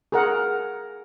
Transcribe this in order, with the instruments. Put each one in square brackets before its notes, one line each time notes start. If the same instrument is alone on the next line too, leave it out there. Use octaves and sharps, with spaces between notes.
[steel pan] G#4 A#4 F#5